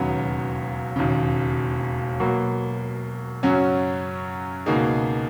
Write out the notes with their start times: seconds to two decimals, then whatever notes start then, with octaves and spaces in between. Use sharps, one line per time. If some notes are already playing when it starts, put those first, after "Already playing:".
Already playing: E1 D#2 C#3 F#3 B3
0.96 E1 D#2 C#3
2.20 B2 F#3 A#3
3.43 F#2 C#3 F#3 C#4 F#4
4.66 C#2 B2 A#3 D#4 G#4